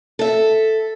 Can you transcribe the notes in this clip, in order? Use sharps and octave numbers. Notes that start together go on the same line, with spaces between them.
A4 E5